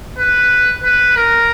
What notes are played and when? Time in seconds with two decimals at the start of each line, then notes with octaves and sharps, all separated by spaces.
0.19 B4
0.83 B4
1.17 A#4